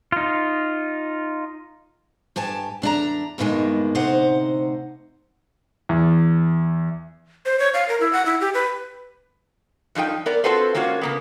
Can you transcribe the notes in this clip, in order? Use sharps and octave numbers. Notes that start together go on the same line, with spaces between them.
D#4 F4
G2 G4 G#5 A5
E2 D4 F#4 A#5
E2 G2 B2 D#3 G#3 A#3
D2 C3 D#4 C5 F#5
E2
C5
C#5
F5
A#4
E4
F#5
E4
G4
B4
G2 F3 D#4 G#4 G5
B3 A#4 D5
C4 F4 F#4 A4 B4 C5
G#3 A#3 C#4 F4 F#4
C#3 A#3 B3